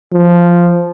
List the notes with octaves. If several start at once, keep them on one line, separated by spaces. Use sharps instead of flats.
F3